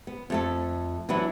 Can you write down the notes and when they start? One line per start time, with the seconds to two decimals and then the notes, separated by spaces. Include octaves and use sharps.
0.07 B3
0.30 F2 A3 A4
1.09 E3 F#3 B3 D4 E4